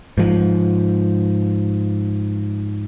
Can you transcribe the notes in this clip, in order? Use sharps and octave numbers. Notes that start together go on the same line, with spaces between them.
G#2 F3